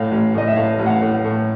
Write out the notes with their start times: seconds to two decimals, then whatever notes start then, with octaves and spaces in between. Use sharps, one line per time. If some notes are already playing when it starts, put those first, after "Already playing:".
Already playing: A2 F5
0.11 A1
0.34 A2 D#5
0.47 E5
0.56 A2 F5
0.79 A1
0.86 F#5
0.90 F5
1.02 A2
1.24 A2